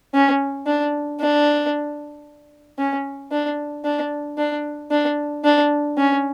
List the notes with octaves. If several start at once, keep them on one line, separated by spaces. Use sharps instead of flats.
C#4
D4
D4
C#4
D4
D4
D4
D4
D4
C#4